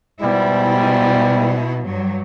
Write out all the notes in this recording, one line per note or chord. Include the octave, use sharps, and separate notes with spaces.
G#2 B2 G3 E4
G2 F#3